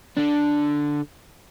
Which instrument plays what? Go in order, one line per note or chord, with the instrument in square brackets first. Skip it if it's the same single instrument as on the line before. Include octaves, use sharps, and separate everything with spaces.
[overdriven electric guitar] D3 D4